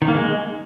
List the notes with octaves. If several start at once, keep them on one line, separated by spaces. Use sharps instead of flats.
D#3
A#3
G#3